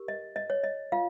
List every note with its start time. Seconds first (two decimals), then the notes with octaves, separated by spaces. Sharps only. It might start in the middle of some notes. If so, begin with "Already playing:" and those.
Already playing: G4 A#4
0.08 D#5
0.36 D#5
0.50 C#5
0.64 D#5
0.92 F4 F5